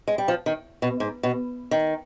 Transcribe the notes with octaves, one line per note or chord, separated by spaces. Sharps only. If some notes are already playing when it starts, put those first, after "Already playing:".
G#3
G3
F3
D#3
B2
G#2
B2
D#3